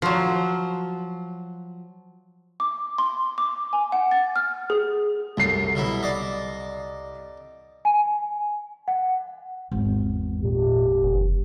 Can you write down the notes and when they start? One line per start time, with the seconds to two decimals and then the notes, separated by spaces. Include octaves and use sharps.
0.02 F3 F#3
2.60 D6
2.98 C6
3.38 D6
3.73 G#5
3.92 F#5
4.11 A6
4.36 F6
4.70 G#4
5.37 C2 F#2 A4 C7
5.75 B2 F#3 E4
6.03 D5 D#5
7.85 G#5
8.88 F#5
9.72 G#1 E2
10.44 A#2 G4
11.03 F#1